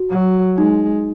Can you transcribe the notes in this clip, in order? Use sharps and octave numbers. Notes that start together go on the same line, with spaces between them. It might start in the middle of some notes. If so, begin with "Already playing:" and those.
Already playing: F#4
F#3
G#3 D#4